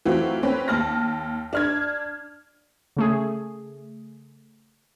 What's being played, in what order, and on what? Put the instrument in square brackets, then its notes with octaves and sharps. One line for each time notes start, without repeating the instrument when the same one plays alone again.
[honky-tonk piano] E3 F#3 A3 C4 F4 F#4
C4 C#4 B4
D#2 A5 F6 A#6
D4 F6 G#6
[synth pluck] C#3 A3 G#4